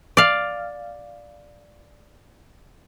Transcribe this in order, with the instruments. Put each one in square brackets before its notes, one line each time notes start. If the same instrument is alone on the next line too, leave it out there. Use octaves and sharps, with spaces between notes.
[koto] D5 F5